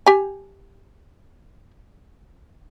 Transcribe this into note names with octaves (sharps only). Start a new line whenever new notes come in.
G4 G#5